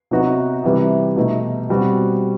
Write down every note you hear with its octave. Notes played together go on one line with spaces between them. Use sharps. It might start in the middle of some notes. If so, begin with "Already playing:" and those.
C3 F#3 B3 D#4 F#4
C3 E3 G3
B2 A3 D#4
B2 G3 C4 F#4